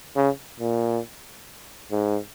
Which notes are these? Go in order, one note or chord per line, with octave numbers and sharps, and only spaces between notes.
C#3
A#2
G#2